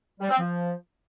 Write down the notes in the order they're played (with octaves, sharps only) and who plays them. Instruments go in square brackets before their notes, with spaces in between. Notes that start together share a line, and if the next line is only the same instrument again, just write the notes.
[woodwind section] G3
C4
F3